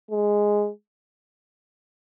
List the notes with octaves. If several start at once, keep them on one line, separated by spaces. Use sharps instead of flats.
G#3